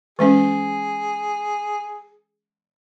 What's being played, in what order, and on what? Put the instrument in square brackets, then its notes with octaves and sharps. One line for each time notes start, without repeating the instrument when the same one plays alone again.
[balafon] E3 G#3 C#4 [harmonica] G#4